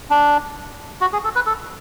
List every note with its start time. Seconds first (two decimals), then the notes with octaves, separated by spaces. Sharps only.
0.10 D4
1.01 F#4
1.13 G#4
1.24 A4
1.35 B4
1.46 A4